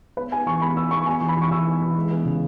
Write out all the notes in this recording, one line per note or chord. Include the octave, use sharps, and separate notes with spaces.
B3 B4
B3 G#5
E3 C#6
B3 B5
B3 E6
B3 C#6
B3 G#5
E3
B5
E3 C#6
E3 E6
B3
E3
G#3
B3
C#3